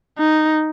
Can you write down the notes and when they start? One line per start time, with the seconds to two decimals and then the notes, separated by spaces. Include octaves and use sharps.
0.18 D#4